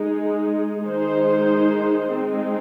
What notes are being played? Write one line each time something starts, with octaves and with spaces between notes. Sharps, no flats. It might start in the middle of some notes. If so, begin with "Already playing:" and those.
Already playing: G#3 D#4 G#4
D#3 G#3 D#4 G#4 C5
G#3 C4 D#4